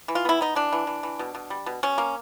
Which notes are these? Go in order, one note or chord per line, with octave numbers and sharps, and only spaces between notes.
E3
F4
B3 E4
B3 D#4
E3 D4
E3
E3
E3
B2
B2
G3
B2
B2 C#4
A#3